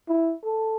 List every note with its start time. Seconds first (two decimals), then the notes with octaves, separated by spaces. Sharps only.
0.08 E4
0.44 A4